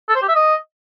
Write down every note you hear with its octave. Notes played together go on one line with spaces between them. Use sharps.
A4
C5
G4
E5
D#5